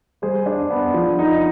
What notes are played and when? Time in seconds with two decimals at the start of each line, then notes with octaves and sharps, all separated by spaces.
0.22 G3 G#4 C5
0.46 D4
0.70 B3
0.94 F3
1.19 D#4